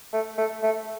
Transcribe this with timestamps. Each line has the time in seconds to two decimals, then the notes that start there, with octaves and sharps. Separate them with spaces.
0.13 A3
0.38 A3
0.63 A3